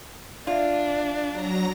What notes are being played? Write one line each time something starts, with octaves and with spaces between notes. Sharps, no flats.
D4 F4 D5 E5
F#3 A#5 A#6